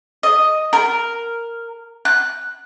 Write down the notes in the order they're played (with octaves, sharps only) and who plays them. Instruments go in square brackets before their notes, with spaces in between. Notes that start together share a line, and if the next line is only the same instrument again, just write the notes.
[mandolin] D#5
A#4
F#6